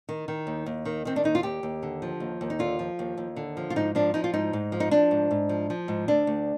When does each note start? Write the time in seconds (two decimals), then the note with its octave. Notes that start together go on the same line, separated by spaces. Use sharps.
0.09 D#3
0.28 D#3
0.47 D#2
0.66 D#2
0.85 D#3
1.05 D#3 C4
1.16 D4
1.24 D#2 D#4
1.35 F4
1.43 D#2 G4
1.63 D#2
1.83 D3
2.02 F3
2.20 D#2
2.41 D#2
2.50 D#4
2.59 D3 F4
2.79 F3
2.99 D#2
3.17 D#2
3.36 D3
3.57 F3
3.70 F4
3.76 G#2 D#4
3.95 F3 D4
4.14 F3 D#4
4.24 F4
4.33 G#2 D#4
4.53 G#2
4.72 F3
4.80 D#4
4.91 F3 D4
5.11 G#2
5.31 G#2
5.49 F3
5.70 F3
5.88 G#2
6.08 D2 D4
6.27 D2